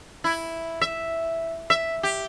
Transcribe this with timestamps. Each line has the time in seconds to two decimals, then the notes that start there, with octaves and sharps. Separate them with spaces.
0.24 E4
0.81 E5
1.70 E5
2.03 G4